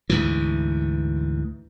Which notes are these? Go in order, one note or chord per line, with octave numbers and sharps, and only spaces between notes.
D2 G#2 E3